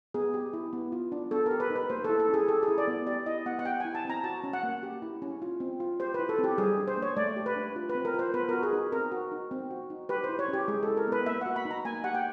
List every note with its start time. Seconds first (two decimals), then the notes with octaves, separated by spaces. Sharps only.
0.14 B3 G#4
0.34 G4
0.53 E4
0.73 B3
0.92 F4
1.12 D4
1.31 B3 A4
1.46 G4 A#4
1.60 B4
1.70 D#4
1.76 B4
1.90 A#3 C5
2.04 E4 A4
2.19 A4
2.29 C#4 G#4
2.48 G4 A4
2.63 G#4
2.68 E4
2.78 D5
2.87 B3
3.07 G4 D5
3.26 E4 D#5
3.46 B3 F#5
3.59 F#5
3.65 G4 G5
3.80 E4 G#5
3.95 A5
4.05 C4 A#5
4.24 F#4 A5
4.44 C#4
4.53 F#5
4.63 A#3
4.83 G4
5.02 E4
5.22 C#4
5.42 F4
5.60 C4
5.80 F4
6.00 G4 C5
6.14 E4 B4
6.29 A4
6.39 C4
6.44 G4
6.58 G3 G#4
6.78 D4
6.88 C5
6.97 A#3
7.02 C#5
7.17 A3 D5
7.36 G4
7.46 B4
7.56 D4
7.76 F4
7.89 B4
7.95 C4
8.05 A#4
8.14 F4 C5
8.34 B3 B4
8.49 F#4 A#4
8.63 G#4
8.73 D#4
8.92 C4 A#4
9.12 F#4
9.32 D#4
9.51 C4
9.71 F#4
9.90 D#4
10.09 G4 B4
10.24 C5
10.29 E4
10.39 C#5
10.48 C#4
10.53 G4
10.68 G#3 G#4
10.83 E4 A4
10.97 A#4
11.07 B3 B4
11.26 A#3 E5
11.41 F#4 F#5
11.56 B5
11.65 D#4
11.71 A#5
11.85 A#3 G#5
12.04 G4 F#5
12.15 G5